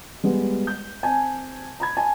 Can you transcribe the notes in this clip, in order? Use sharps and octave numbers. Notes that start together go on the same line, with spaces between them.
G3 G#3 B3
G6
C4 G#5 A5
A#5 B5 G#6
G#5 A5